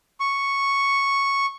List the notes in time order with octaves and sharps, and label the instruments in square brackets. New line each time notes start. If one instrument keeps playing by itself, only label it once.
[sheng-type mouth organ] C#6